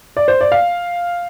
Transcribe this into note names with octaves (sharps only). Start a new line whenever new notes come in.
D5
C5
D5
F5